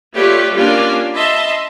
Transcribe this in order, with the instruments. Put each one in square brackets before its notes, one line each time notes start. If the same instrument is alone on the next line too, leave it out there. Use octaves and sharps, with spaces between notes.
[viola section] A3 F4 G4 B4 C#5 D5
G3 A#3 C#4 D4 F4 G#5
D#5 E5 A5 B5 C6